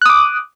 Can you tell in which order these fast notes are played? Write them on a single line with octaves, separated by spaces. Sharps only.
F#6 D#6 D6